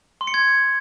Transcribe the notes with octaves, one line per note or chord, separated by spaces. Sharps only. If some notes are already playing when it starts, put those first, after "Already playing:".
C6
C#7
G#6